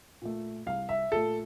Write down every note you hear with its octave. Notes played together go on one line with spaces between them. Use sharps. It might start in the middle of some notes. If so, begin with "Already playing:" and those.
A#2 A3
C2 F5
E5
A#2 A3 A4